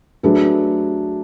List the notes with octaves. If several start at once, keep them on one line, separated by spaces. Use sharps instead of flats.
F#3 A3 D4 G#4 B4